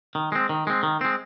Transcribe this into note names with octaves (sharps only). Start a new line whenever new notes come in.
D#3
G#3 C4
D#3
G#3 C4
D#3
G#3 C4